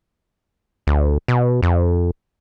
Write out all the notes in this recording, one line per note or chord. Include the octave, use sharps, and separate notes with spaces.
D2
B2
F2